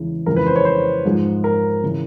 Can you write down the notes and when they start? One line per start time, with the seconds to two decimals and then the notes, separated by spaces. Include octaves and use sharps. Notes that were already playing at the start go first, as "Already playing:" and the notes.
Already playing: E2 C#3 E3 G#3
0.26 F2 C#3 E3 G#3 A#4
0.37 B4
0.47 C5
0.56 C#5
0.65 C5
1.05 G#2 F3 G#3
1.44 A#4
1.84 C#3 E3